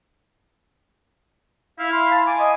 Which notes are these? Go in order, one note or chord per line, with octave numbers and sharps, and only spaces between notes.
E4 F5
E4 C6
A5
G#5 D6
D#5